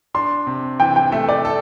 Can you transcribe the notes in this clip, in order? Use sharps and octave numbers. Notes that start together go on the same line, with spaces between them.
D4 C6
C3
E3 G5
G5
A3 E5
D5
A4